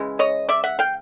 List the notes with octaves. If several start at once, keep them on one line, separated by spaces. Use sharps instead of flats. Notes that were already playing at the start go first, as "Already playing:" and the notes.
Already playing: C#3 E3 G#3
C#5 D#5
D5 E5
E5 F#5
F5 G5